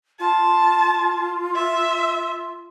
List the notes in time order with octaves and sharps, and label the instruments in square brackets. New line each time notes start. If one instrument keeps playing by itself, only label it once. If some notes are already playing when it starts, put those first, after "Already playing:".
[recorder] F4 [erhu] A5
[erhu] E5